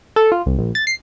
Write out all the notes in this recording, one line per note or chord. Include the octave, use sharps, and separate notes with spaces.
A4
F4
C2
A#1
A6
C7